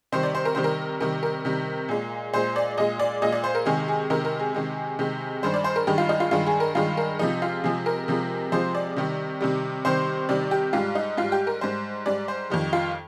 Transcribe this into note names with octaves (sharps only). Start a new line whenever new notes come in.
C3 D#3 G3 C5
D5
C5
A#4
C3 D#3 G3 C5
A#4
C3 D#3 G3 A#4
A#4
C3 D#3 G3
A#2 G#3
A#2 G#3 C5
D5
A#2 G#3 D#5
D5
A#2 G#3 D#5
D5
C5
A#4
C3 D#3 G#3 G#4
G#4
C3 D#3 G#3 A#4
A#4
G#4
C3 D#3 G#3
C3 D#3 G#3
G2 D#3 G#3 C5
D5
C5
A#4
G2 D#3 G#3 G4
F4
D#4
F4
G2 D#3 G#3 F4
G#4
A#4
G2 D#3 G#3 F4
A#4
C3 F3 G#3 D#4
F4
C3 F3 G#3 G#4
A#4
C3 F3 G#3
C3 F3 G#3 C5
D5
C3 D#3 G3
C3 D#3 G3
C3 D#3 G3 C5
C3 D#3 G3 D5
G4
G#2 G3 F4
D#4
G#2 G3 F4
G4
A#4
G#2 G3 C5
G#2 G3 D5
C5
F2 D#3 G3
F4